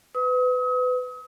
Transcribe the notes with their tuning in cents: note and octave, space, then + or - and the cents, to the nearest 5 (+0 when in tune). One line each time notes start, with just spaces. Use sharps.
B4 +25 D#6 +40